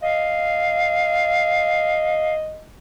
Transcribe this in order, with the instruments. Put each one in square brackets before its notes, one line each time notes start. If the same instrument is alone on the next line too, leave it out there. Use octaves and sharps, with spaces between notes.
[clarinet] D#5 [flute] F5